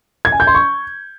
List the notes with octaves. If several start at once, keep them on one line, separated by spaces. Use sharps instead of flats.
G#6
G#5
G6
C6
C#6